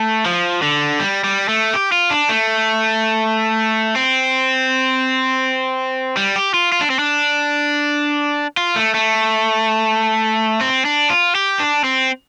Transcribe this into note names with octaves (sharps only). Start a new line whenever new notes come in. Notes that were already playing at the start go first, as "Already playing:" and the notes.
Already playing: A3
F3
D3
G3
G3
A3
G4
F4
D4
A3
C4
G3
G4
F4
F4
D4
C4
D4
F4
A3
A3
C4
D4
F4
G4
D4
C4